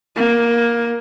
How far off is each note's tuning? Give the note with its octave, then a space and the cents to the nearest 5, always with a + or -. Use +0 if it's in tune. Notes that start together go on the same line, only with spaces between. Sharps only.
A#3 +10